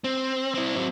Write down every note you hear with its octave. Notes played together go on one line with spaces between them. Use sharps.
C4
C4 E4
F#3 C4